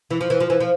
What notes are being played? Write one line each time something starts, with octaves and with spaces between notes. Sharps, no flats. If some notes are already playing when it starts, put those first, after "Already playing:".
E3
F3
E3
F3
E3
F3